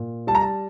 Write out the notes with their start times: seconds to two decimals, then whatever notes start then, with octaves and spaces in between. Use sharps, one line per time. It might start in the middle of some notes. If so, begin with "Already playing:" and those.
Already playing: A#2
0.27 G3 A5
0.35 A#5
0.42 A5